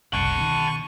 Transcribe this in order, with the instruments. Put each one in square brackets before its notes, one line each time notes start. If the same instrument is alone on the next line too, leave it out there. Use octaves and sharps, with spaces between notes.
[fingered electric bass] F#1 C2 [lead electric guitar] F#5 A5 [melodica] C#6
[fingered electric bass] B2 D#3